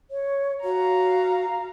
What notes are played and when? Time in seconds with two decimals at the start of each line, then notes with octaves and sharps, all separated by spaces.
0.11 C#5
0.64 F#4 F5 A#5